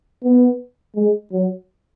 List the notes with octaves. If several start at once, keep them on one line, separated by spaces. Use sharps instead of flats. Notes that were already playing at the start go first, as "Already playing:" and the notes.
B3
G#3
F#3